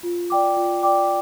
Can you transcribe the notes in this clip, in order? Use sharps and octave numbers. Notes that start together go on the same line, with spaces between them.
F4
D5 G5 D6
F4
D5 G5 D6